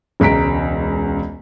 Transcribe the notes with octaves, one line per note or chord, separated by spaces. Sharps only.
E1 C#2 A#5 B6 D7